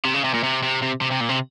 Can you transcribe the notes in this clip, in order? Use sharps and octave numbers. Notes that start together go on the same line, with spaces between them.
C3
C#3
C3
A#2
C3
C3
C3
C3
C3
A#2
C3